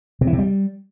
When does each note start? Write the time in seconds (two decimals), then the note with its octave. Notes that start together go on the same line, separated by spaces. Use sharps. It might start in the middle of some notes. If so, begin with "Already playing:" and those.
0.21 C3
0.27 E3
0.33 C3
0.39 G3